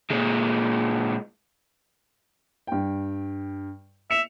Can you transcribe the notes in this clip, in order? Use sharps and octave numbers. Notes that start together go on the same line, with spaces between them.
A#2 G#3
G2 G5
E5 C#7 E7 F7